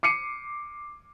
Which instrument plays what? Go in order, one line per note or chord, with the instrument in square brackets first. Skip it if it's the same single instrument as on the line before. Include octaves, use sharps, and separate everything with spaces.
[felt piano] D6 C7 C#7 D#7